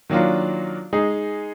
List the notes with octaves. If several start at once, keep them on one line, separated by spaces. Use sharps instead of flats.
D#3 F#3 A#3 D4 F4
G#3 D#4 G#4